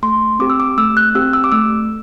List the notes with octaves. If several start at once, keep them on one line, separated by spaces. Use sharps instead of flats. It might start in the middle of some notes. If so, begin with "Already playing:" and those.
A3 C6
C4 G4 D6
E6
D6
A3 E6
F#6
C4 G4 E6
E6
D6
A3 E6